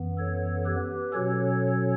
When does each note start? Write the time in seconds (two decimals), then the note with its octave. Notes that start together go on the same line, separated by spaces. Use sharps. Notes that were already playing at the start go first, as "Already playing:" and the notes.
Already playing: F#2 E3 B3
0.18 A4 C#5
0.66 G4 B4
1.13 B2 F#3 C#4 A4 C#5